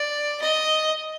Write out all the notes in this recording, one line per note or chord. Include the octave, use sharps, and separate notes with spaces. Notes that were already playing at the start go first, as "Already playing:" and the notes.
Already playing: D5
D#5